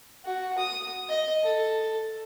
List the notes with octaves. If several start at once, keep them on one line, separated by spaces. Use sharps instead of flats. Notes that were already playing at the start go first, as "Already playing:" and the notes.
F#4
D#6
D#5
A4